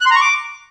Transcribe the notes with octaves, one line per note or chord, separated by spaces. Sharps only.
F#6
C6
A#5
C#6
D6